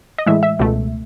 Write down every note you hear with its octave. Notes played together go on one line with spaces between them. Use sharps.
D#5
A2 E3 G#3 E5
E5
C#2 B2 A3